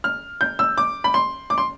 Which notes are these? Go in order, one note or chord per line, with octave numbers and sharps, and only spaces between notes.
F6
G6
E6
D6
B5
C6
D6
C6